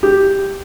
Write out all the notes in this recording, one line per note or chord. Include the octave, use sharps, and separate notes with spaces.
G4